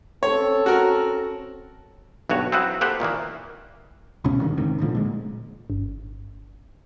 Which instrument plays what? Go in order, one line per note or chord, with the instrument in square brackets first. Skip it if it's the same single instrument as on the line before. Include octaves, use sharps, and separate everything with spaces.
[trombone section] C4 C#4 A4 [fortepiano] C#5
[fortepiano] F#4 A#4
[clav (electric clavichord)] B1 G2 F#4 C#5
C4 D#4 E4 F#4 B4
A#3 G4 A4 B4 C5 F#5
A#2 D#3 E3 A#3
[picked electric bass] C#2 B2 C#4
G2 A#2 D3 D#3
D2 G#2 C3 D#3
B1 A2 D3 F3
A#2 G#3
[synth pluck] G1